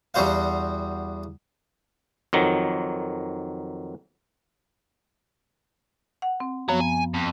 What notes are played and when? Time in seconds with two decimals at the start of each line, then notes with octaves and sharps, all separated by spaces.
0.14 E2 G3 F#4 C5 F5
2.33 F2 D#3 F#3
6.22 F#5
6.40 C4
6.69 F#2 F3 B3 F#4 C#5
6.81 G#5
7.14 F2